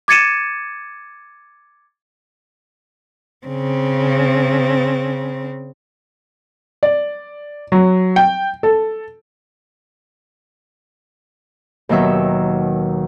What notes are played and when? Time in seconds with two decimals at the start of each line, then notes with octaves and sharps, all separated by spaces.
0.08 D6 G#6 A6 C#7 D#7 E7
3.47 C#3 C4
6.83 D5
7.72 F#3
8.16 G5
8.63 A4
11.89 D#2 B2 D#3 F#3 E5 E6